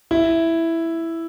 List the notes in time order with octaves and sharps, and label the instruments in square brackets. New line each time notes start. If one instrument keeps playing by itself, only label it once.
[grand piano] E4